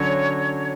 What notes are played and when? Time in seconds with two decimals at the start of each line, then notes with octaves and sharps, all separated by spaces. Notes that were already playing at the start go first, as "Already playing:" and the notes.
Already playing: D3 F#3 C#4 F#4 C#5